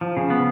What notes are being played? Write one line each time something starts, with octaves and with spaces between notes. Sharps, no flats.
F3
C#3
B3